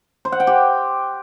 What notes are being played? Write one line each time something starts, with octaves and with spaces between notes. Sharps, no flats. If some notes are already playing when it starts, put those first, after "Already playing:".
C5
F#5
G5
G4